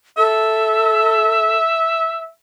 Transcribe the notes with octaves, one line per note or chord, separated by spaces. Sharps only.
A4 E5